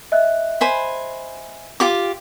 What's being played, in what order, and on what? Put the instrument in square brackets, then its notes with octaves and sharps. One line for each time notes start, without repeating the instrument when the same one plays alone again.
[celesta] D#5 E5 F#6
[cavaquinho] C5 G#5 B5
F4 G4 D6